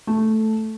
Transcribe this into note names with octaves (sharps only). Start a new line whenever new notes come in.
A3